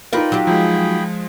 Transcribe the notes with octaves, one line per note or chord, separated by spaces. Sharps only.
D#4 F4 A#4 B4 D5 F5 G5
F#3 G4
F3 G#3 G#4 G5 B5